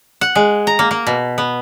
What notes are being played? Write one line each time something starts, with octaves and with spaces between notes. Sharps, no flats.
F#5
G#3
A#5
A#3
A#3
B2
B3